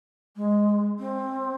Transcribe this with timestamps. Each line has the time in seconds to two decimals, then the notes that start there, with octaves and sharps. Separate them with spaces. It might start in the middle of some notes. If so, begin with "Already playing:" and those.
0.36 G#3
0.99 C4